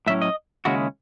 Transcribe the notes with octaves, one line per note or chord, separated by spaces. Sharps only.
A2 F#3 C#4 E4 E5
D#5
D#2 C#3 G#3 C#4 E4 F#4